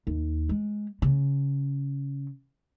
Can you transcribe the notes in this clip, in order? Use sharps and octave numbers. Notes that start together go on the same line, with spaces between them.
D#2
G#3
C#3